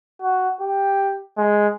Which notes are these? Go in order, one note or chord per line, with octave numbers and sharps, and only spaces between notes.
F#4
G4
G#3